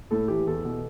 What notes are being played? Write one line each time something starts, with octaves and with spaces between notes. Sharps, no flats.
A2 A4
E3 G4
E2 A4
B2